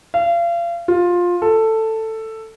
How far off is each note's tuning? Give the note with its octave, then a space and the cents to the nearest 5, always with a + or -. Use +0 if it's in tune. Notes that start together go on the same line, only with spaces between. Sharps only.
F5 -35
F4 +15
A4 +10